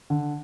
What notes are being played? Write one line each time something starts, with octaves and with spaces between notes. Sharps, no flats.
D3